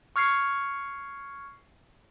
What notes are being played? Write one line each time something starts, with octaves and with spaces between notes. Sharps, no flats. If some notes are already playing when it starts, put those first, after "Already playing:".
C#6 F6 G#6 C7 C#7